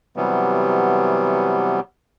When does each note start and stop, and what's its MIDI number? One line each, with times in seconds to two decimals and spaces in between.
0.16 1.80 48
0.16 1.80 52
0.16 1.80 54
0.16 1.80 55
0.16 1.80 59